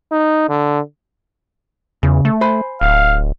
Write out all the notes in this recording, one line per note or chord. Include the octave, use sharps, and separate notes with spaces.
D#4
D3
E2 C#3
A3
C5 G#5 B5
D1 F5